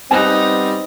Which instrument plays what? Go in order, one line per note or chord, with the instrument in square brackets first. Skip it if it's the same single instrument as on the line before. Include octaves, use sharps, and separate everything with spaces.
[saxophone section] G3 B3 C4 [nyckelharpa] D#4 [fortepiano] G#5 F#6